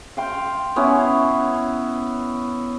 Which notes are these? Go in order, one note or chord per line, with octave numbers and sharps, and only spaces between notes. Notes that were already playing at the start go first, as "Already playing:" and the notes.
F5 G5 C6
B3 C#4 E4